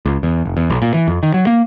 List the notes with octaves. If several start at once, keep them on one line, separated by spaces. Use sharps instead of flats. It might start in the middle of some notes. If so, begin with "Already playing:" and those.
C#2
E2
F1
E2
B1
A#2
E3
F2
D#3
F#3
A#3